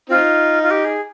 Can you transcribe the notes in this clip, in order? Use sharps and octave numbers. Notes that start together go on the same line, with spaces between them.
C4 D#4 F4
F4
G4
G#4